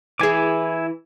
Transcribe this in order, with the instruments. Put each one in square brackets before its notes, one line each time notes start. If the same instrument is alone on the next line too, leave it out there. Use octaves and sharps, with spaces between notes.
[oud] E3 G#4 [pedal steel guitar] E4 G#5 D6